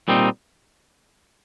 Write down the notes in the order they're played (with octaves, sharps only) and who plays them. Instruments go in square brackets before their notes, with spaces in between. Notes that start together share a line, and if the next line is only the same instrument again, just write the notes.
[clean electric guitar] A#2 G3 C4 D#4